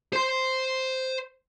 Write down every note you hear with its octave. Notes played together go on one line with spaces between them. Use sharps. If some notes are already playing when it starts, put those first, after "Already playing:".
C5 C6